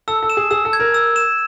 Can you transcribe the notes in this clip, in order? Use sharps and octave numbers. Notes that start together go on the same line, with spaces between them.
A4 E6
A4
E7
G#4
G#4 E6
A4
G#6
A#4
E6
E7